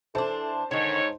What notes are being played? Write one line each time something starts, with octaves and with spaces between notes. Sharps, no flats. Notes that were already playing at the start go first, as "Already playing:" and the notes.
E3 D4 A4 C5 A5 C6
G#2 D3 D#3 D#4 C#5